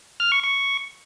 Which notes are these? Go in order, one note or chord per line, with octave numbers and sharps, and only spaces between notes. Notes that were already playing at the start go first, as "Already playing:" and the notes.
F6
C#6
C#6